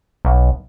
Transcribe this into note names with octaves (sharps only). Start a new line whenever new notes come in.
B1